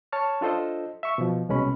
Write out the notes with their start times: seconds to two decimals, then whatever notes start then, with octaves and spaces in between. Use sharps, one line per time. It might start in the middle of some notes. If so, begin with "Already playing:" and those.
0.12 C#5 A5 C#6 F6
0.41 D4 F4 A4 C5 D#5
1.03 E5 C#6
1.18 B2 F3
1.49 C2 B2 G#3 C#4 B5